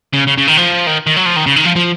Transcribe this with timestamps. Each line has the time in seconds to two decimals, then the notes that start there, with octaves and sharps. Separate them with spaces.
0.13 C#3
0.27 C#3
0.37 C#3
0.47 D#3
0.57 F3
0.87 D#3
1.07 D#3
1.16 F#3
1.26 F3
1.36 D#3
1.46 C#3
1.56 D#3
1.65 F3
1.76 F3